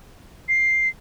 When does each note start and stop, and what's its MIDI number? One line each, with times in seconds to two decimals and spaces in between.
0.49 0.88 96